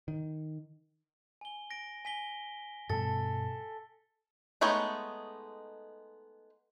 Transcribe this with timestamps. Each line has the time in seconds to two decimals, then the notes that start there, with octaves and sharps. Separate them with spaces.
0.08 D#3
1.41 G#5 G7
1.71 A#6 D7
2.05 G#5 B6 G7
2.90 G2 B2 G3 A4 A6
4.61 G#3 A3 B3 D#4 C#5